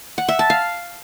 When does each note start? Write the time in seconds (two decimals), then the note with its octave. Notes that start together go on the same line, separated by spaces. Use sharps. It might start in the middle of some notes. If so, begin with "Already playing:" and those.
0.18 F#5
0.28 E5
0.39 A5
0.50 F5